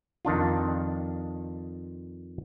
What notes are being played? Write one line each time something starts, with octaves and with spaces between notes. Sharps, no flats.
F2 D#3 D4 F4